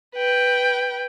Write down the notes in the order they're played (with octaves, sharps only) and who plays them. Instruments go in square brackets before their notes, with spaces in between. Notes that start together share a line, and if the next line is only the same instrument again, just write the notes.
[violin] B4 G5